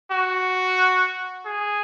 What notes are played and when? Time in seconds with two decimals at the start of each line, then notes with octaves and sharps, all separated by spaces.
0.11 F#4
1.45 G#4